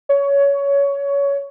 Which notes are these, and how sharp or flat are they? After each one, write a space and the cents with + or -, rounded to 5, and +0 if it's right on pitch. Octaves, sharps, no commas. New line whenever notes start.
C#5 +20